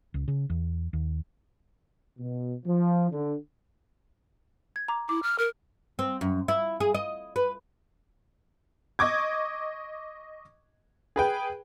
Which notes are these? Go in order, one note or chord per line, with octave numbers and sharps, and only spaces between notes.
C#2
C#3
E2
D#2
B2
F3
D3
G#6
A#5 D6
E4 D6
F6
A#4 F6
C4
F#2
E4
G#4
D#5
B4
D#5 C#6 D6 G#6
G#4 B4 G5